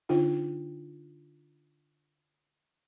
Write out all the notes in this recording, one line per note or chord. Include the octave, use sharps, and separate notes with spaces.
D3 D4 D#4 F4 G5